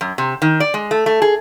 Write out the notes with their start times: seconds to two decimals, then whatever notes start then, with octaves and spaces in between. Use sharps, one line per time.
0.01 F#2
0.18 C3
0.42 D#3
0.60 D5
0.74 G#3
0.91 A3
1.06 A3
1.22 G#4